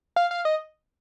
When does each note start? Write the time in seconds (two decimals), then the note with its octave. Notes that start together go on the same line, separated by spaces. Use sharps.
0.16 F5
0.31 F5
0.45 D#5